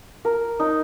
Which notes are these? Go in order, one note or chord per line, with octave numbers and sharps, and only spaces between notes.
A#4
D#4